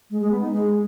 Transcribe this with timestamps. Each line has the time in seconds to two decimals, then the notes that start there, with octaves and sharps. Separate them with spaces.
0.11 G#3
0.21 G#3
0.31 B3
0.41 D#4
0.52 G#3